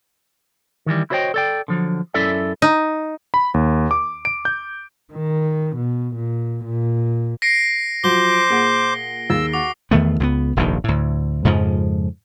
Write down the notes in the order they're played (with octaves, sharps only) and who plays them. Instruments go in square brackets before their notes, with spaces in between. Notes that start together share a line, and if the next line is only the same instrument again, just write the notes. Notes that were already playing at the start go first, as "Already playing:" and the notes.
[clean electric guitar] D#3 E3 G3
E4 F#4 C5 C#5 D#5 G5
A4 D5 G5
D3 F3 F#3
F#2 C#4 E4 A4 D5 E5
[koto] D#4
[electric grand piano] B5
D#2
D6
D7
G6
[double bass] D#3
B2
A#2
A#2
[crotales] A#6 C7 D7
[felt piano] F3 F#3 [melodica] C5 D6 [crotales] G7
[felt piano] A#2 G#4 F#5
[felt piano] D#2 G#4 A6 [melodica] E6
[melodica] F#4 [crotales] D6
[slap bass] E2 D#3 A3 B3
C#2 F3 B3
F1 A#1 D#2 D#3
D2 A2
F2 G#2 C#3 F3